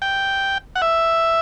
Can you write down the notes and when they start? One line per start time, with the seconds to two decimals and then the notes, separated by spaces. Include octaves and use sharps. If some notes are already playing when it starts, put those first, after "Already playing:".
0.02 G5
0.76 F#5
0.82 E5